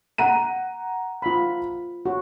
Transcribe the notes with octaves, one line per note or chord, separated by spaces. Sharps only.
F#5 A#5 D#7
F4 B5
F#4